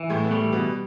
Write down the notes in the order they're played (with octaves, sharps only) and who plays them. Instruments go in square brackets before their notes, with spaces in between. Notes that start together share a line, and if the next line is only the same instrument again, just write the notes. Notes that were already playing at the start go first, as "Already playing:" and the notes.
Already playing: [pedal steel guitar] E3
[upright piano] A2 A3
B3
[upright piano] A2 A3 [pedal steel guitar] G3
[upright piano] B2 B3